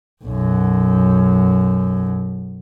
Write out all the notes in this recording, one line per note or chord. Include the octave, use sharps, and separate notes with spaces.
B1 F#2